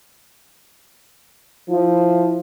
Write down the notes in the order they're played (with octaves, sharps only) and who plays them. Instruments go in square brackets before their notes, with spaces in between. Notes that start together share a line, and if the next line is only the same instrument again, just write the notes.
[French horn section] F3 E4